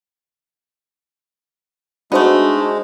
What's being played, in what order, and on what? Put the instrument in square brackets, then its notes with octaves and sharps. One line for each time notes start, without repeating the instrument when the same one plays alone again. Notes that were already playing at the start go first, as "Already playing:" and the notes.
[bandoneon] G#3 [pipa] A3 B3 [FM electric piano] D4 F#4 C5 [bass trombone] D#4